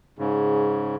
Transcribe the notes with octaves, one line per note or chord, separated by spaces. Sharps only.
G#2 C#3